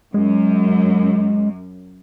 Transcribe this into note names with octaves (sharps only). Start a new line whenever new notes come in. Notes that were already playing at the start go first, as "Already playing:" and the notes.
F#2 G#3